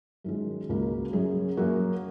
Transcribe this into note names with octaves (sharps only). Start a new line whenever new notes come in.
F#2 D#3 G#3
C#2 C#3 A#3 F#4
F#2 F#3 C#4 G#4
F#2 F#3 A#3 F#4